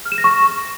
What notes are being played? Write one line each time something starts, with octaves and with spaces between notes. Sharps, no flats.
F6
E7
A#6
C#6